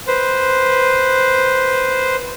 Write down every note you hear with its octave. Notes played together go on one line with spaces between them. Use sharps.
B4 C5